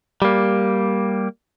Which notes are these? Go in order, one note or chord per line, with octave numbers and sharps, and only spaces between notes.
G3 A#3